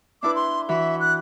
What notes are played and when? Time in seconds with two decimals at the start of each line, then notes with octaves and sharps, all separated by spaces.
0.23 D4 E4 B4 D6
0.35 C6
0.69 E3 F#4 E5 B5
1.00 F#6